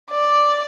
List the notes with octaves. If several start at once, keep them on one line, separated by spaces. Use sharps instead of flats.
D5